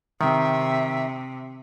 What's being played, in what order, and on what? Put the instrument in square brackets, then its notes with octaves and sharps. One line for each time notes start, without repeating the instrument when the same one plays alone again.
[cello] C3 [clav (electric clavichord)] D#3 [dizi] E5